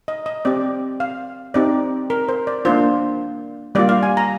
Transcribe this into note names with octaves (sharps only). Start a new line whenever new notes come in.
D#5
D#5
C4 G4 D5
F5
C4 D#4 G4 D5
A#4
C5
D5
A#3 D4 F4 C5
G3 A#3 F4 D5
F5
G#5
A#5